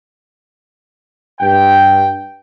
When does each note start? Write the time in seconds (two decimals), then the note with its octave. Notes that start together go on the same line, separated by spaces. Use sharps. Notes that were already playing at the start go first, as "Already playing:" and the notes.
1.40 G2 G5